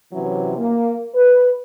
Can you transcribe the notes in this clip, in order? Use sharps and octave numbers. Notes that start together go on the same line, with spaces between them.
C3 E3 F#3 C#4 E4
A#3
B4